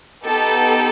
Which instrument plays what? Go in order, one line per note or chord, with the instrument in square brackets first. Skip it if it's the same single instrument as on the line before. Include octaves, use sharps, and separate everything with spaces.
[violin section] B3 D#4 G4 A4